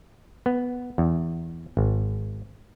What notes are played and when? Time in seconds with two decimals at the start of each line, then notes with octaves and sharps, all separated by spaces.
0.46 B3
0.98 E2
1.77 G#1